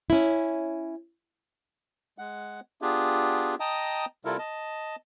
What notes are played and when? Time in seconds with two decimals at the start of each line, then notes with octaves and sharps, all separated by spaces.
0.10 C#4 E4
2.18 G#3 F#5
2.82 B3 D4 F4 G4 G#4
3.60 D#5 G5 A5 A#5 D#6
4.25 C3 G3 E4 F4 A4 A#4
4.39 D#5 A5